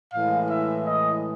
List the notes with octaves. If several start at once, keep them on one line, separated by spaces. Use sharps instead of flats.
A2 E3 G#3 F5
E5
D#5